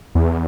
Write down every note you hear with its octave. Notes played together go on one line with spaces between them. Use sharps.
E2